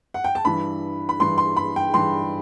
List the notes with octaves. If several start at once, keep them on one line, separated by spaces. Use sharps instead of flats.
F#5
G5
A5
G2 E3 B5
B5
G2 E3 C6
C6
B5
G5
G2 E3 C6